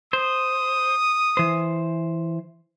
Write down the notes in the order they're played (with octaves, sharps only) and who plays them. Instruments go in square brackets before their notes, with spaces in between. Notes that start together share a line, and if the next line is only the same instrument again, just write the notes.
[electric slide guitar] C5 [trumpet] D#6
[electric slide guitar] E3 C5